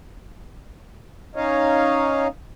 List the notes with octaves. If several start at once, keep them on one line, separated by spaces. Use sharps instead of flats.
C#4 D#4 C#5 D#5 F5